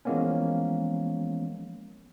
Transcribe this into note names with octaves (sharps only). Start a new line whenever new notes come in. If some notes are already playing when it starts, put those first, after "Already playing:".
E3 F3 G#3 A#3 B3 C#4